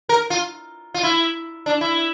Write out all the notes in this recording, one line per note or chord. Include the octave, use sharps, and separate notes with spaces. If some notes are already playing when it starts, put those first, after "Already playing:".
A#4
F4
F4
E4
D4
E4